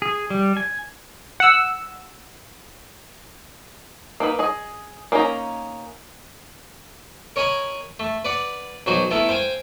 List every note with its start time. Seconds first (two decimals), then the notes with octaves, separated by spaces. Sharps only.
0.02 G#4
0.30 G3
0.57 G#5
1.40 F#5 E6
4.20 A#3 D#4 B4
4.39 G#4 D#5
5.12 A#3 C#4 D#4 A#4 A#5
7.36 A#4 C#5 D#5 G#5 A#5 B5
8.00 A3
8.25 B4 D5 F#5
8.86 B1 F#3 F#4 C5 D#5
9.11 A3 B3 E4 A4 A#4
9.29 C5 F5 G5 G#5